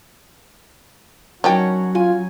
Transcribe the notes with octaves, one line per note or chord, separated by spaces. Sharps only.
D#3 F#3 C#4 D4 F#4 C#5 G5
F4 G#5